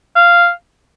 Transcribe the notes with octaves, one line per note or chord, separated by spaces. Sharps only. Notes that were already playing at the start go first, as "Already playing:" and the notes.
F5